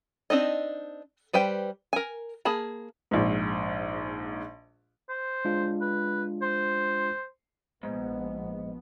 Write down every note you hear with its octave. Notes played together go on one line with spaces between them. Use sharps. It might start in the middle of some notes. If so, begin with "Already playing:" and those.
C4 D4 D#4 D#5
G3 B4 C5 G5
A#4 G#5
A#3 G#4 A5 B5
A#1 G#2
C5
G#3 D4 F4
B4
C5
A#1 G#2 F3 B3